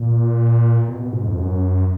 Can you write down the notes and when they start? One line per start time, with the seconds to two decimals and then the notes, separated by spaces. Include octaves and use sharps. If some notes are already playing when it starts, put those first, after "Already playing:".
Already playing: A#2
0.88 B2
1.00 B2
1.12 G#2
1.26 F2
1.38 F#2